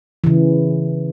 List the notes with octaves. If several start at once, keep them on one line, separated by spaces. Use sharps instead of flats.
C#3 E3